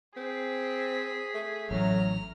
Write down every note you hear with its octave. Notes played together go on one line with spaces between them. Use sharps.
C4 G#4 B6
A3
A1 F#3 A#5 F6